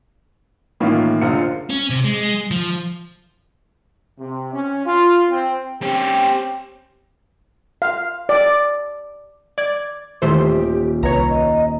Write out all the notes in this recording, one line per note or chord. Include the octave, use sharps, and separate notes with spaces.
A2 D#3 E3 A#3 C#4 F4
F#1 D3 F4 C5 C#7
C#4
C3
G#3
F3
C3
C#4
F4
C4
C4 C#4 G4
F5
D5
D5 G#6
D#1 E3 A3 G4 C5
C2 B4 C#5 A#5
D#5